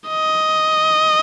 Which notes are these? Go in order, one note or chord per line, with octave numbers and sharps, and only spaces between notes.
D#5